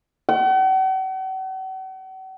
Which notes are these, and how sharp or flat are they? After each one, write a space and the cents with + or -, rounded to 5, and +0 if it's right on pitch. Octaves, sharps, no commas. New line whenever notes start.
F#5 +45